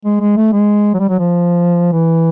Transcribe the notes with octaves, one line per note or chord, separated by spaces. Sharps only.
G#3
G#3
A3
G#3
F#3
G3
F#3
F3
E3